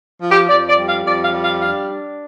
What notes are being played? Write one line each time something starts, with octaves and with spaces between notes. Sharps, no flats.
F3
G4
F2 D5
D5
G3
F5
F2 D5
F5
G3
F5
D4 F5
D4